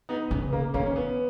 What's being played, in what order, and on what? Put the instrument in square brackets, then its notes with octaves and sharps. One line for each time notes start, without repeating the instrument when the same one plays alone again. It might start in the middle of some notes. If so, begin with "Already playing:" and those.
[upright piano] B3 D#4
[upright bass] C#3 [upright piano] B3
[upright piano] A#3
[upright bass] D#3 [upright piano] A#3 C#4
[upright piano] C#4
B3